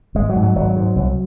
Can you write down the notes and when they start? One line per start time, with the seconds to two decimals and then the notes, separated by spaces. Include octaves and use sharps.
0.15 G#1 G#3
0.29 F#3
0.36 G#2
0.43 F#3
0.55 G#1 F#3
0.76 G#2
0.96 C2